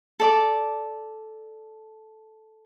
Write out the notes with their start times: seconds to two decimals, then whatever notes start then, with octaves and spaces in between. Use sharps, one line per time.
0.20 A4 D5 D6